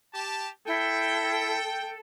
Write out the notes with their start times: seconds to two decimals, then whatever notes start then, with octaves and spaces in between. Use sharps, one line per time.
0.14 G4 A5
0.67 E4 A4 G5